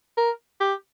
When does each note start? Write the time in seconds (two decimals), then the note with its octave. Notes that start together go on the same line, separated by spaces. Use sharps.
0.17 A#4
0.61 G4